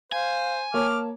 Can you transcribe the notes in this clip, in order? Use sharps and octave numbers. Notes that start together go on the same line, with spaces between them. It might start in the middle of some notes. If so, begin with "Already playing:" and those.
C5 F5 G#5
A#3 C#5 A5 D6 F6